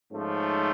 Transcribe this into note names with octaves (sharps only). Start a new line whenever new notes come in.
G#2 F3 A3 C#4